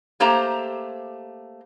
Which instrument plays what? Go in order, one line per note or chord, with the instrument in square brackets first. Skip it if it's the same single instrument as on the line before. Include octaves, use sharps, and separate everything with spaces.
[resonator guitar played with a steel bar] A3 A#3 G4 C5 A#5